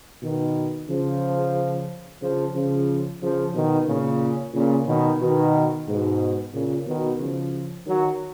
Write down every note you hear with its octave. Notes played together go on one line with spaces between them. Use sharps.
B2 D#3
C#3 F3
C#3 F3
C#3 F3
C#3 F3
B2 D#3
A#2 C#3
A#2 C#3
B2 D#3
B2 D#3
G#2 B2
A#2 C#3
B2 D#3
C#3 F3
D#3 F#3